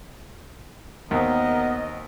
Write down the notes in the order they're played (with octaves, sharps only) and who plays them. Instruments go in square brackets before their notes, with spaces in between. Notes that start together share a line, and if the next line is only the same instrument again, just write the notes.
[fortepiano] D#2 C4 [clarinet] B3 [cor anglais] A#4 [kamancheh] D#5